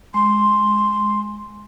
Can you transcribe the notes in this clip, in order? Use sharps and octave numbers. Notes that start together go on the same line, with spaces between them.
G#3 C6